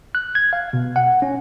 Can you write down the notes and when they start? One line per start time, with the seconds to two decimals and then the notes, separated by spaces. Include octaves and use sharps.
0.15 F#6
0.35 G#6
0.53 F5
0.73 B2
0.96 F#5
1.22 C#4